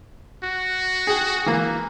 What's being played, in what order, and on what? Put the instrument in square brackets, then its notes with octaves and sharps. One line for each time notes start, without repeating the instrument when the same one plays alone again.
[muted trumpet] F#4
[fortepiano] G#4 G5
E3 A#3